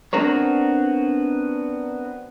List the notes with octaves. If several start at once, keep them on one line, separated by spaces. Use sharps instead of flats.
B3 C4 D4 F#4 A#4 C#5